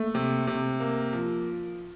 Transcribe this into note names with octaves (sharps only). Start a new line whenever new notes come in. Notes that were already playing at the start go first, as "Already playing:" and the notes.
Already playing: A3 A#3
C3
C3
A#3
F3